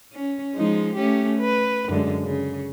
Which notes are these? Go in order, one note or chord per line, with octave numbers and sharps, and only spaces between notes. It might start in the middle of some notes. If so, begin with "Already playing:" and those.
C#4
F3 G#3 D#4
A3 C#4 G4
B4
F#2 D3 G#3
C#3